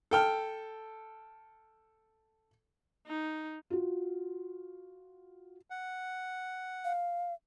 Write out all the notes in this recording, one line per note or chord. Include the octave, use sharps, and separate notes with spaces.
A4 G5 F6
D#4
F4 F#4
F#5
F5